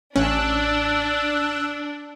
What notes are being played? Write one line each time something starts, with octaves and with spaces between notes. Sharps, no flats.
A1 C#4 D4 E6 F#6